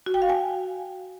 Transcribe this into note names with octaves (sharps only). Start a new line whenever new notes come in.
F#4
G5
F5
G#5